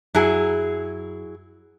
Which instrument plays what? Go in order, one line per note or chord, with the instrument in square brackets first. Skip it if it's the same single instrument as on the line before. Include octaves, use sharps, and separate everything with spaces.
[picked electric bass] F#2 [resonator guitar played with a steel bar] F#3 E4 G#4